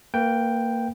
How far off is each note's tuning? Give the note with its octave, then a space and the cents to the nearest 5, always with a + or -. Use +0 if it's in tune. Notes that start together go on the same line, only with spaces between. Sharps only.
A#3 -20 B4 +0 G5 +0